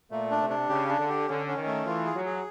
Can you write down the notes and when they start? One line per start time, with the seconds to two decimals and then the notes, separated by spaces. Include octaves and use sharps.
0.10 A#2 A3
0.31 D4
0.41 C3
0.50 D4
0.69 C#3 G4
0.89 D4
0.98 D3
1.09 G4
1.28 D3 C#4
1.47 C#4
1.56 D#3
1.66 A3
1.86 E3 F4
2.05 G#4
2.15 F#3
2.25 G#4